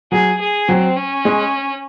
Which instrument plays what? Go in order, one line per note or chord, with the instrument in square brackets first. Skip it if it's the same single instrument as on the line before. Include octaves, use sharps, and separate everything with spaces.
[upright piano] F#3 [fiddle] G#4
[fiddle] G#4
[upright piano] F#3 [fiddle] C4
[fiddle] C#4
[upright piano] G#3